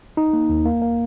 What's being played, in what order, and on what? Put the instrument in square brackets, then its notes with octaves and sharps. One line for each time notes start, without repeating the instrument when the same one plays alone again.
[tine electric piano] D#4
A#3
D#2
A#3
A#3